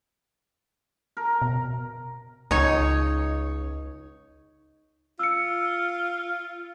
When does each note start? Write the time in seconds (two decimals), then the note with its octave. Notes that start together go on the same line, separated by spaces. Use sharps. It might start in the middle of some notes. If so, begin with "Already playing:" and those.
1.17 A#4
1.42 B2
2.51 C#2 D#4 C#5
5.19 F4 E6 C#7